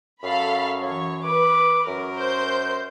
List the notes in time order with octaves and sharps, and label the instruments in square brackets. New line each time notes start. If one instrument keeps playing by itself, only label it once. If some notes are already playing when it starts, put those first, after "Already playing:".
[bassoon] F#2 [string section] A4 F5 B5
[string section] E3 C#5
[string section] B4 [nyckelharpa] D6
[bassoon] F#2 [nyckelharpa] A#4
[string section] C5 G6